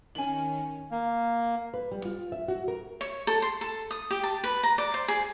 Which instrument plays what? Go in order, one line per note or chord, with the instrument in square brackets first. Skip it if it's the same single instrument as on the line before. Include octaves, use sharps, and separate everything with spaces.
[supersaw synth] D#3 C#4 [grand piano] G#5 F#7
[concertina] A#3
[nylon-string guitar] B4
G3
F4
E5
F#4
A#4
[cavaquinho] C#5
A4
C6
A4
D#6
G4
A5
B4
A#5
D5
C5
G#4